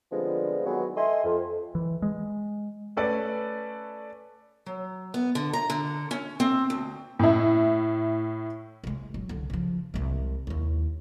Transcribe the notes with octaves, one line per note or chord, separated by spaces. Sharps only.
D3 F3 G3 G#3 B3 C4
D#3 F#3 G#3 B3
A4 D#5 E5 G#5 C6
F2
E3
G#3
A3 C#4 A4 B4 D5
F#3
B3
D3
A#5
D3
C#4
C4
D2
A2 E4
C3 G#3
D#1 F#3
C2 D3
C#3 F3
C2 G#3
D#2 E4